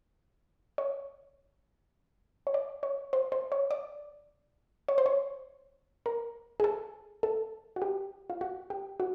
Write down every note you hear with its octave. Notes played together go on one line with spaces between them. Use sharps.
C#5
C#5
D5
C#5
C5
C5
C#5
D5
C#5
C5
C#5
A#4
G#4
A4
A4
F#4
G4
F4
F#4
G4
F#4